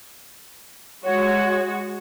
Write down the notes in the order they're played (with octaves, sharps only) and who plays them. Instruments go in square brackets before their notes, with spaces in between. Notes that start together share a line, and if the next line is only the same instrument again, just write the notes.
[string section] G#3 F#4 [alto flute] C#5